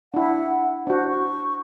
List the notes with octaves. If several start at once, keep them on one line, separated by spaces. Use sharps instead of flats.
D4 E4 F#5
D4 F#4 C5
C#6